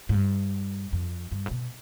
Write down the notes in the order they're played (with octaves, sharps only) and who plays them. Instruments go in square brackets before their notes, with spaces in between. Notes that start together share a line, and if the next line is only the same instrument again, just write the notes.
[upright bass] G#2
G2
F2
G2
G#2
B2